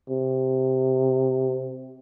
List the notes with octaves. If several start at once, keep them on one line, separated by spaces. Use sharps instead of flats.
C3